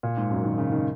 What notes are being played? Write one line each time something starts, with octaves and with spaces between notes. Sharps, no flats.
A#2
G#2
F#2
D#3
C#3
D#3